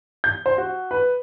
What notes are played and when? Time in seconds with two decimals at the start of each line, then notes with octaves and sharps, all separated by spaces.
0.24 G6
0.46 C5
0.58 F#4
0.91 B4